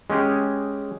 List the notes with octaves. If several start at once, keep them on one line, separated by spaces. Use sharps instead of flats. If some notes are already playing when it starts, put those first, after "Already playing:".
G#3 C#4 G4 G#4